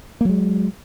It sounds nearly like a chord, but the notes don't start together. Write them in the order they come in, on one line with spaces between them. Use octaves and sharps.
A#3 F#3 G#3